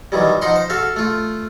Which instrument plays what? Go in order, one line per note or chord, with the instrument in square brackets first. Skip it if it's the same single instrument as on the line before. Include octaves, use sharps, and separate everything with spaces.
[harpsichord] D#3 E3 F#3 G3
F3 D#4 F#5 C6
C5
F#4 A4 E5 F5
A3 F4